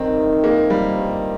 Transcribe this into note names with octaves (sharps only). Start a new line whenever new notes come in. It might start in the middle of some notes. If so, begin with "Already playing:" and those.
Already playing: G2 D#3 C4
C3
F3 A#3
G3 D#4
G2